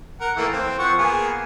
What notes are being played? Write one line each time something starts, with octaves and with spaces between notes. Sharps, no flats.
A#4 F#5
E3 A3 A#3
C4
F3 F#5 C#6
A#3 B3 G#4